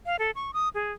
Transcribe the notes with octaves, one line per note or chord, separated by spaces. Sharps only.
F5
A4
C#6
D#6
G#4